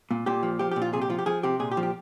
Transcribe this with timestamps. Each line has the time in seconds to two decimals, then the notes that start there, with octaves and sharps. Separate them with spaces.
0.11 A#2
0.26 A#2 G4
0.43 F3
0.59 F3 G4
0.71 G4
0.76 A#2
0.82 F4
0.93 C3 G#4
1.02 G4
1.10 F3 F4
1.19 G4
1.26 F3 G#4
1.43 C3 G4
1.59 A#2 G#4
1.71 G4
1.77 F3
1.83 G4